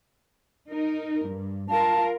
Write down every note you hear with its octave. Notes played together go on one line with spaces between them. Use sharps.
D#4 A#4
G2
F4 A#4 F5 A5